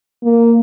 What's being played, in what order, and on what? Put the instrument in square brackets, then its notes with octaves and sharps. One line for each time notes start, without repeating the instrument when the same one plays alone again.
[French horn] A#3